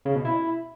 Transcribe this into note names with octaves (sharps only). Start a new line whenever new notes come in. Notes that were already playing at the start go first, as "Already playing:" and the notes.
C#3
B2
E4